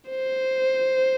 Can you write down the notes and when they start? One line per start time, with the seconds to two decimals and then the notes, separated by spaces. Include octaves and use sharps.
0.10 C5